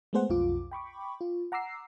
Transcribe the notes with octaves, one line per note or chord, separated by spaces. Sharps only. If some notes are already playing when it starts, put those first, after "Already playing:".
G#3 A3 B3 G#4 C5 F#5
B1 F2 F4 D6
G5 B5 C#6 D6
F4
F#5 A#5 D6 E6 C7